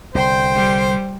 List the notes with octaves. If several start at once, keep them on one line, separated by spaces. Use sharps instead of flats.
C2 D3 C5 G5 C6
G3